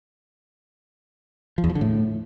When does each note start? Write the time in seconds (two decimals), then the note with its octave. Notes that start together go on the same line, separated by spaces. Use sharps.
1.58 F3
1.64 E2
1.70 F3
1.75 D3
1.81 A2